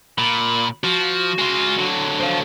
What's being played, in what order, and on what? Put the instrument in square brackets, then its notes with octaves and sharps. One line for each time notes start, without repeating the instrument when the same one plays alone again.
[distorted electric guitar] A#2 [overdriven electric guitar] B5
[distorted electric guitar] F3 [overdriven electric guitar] F#4
[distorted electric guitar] G#3 F4
D3 F#3
[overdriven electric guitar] C5 F5